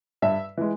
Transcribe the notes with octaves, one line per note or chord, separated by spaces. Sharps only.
G2 E5
E3 G#3